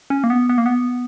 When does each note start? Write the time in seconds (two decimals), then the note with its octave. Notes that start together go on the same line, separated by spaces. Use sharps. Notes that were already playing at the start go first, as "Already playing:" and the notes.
0.10 C#4
0.24 A#3
0.30 B3
0.49 B3
0.58 A#3
0.66 B3